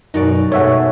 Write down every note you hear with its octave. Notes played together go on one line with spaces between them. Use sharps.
F#2 B2 D#4 F#4 D5
G#2 A3 C#5 E5 F#5